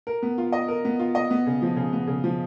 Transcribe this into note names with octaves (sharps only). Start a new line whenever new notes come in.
A#4
B3
F4
D#5
A#4
B3
F4
D#5
B3
C#3
F3
C#3
B3
C#3
F3